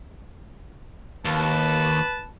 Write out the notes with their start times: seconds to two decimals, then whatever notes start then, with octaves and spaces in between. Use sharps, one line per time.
1.25 D#2 B4 A5